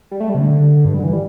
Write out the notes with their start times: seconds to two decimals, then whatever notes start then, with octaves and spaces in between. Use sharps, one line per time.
0.11 G3
0.20 A3
0.29 G3
0.35 C3
0.39 D3
0.85 G2
0.94 G3
1.00 D3
1.04 E3
1.13 G3